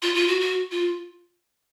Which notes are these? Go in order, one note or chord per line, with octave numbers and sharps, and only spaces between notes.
F4
F4
F#4
F#4
F4